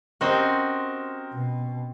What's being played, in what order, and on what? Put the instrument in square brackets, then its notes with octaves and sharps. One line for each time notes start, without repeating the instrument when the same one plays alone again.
[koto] C4 F#4 [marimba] C#4 G4 [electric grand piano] A#4 C5 D#5
[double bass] B2